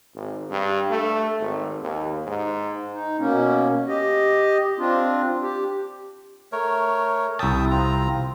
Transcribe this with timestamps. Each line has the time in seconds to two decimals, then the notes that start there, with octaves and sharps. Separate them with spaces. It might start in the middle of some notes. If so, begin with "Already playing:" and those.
0.15 G#1
0.51 G2
0.90 A3
1.40 G#1
1.82 D#2
2.27 G#2
2.93 D#4
3.19 B2 A#3 C#4
3.88 G4 D#5
4.78 C4 D4 F4
5.42 G4
6.52 A3 A#4 C#5
7.39 C2 E5 G5 A5 D#6
7.71 C4 F4 A#5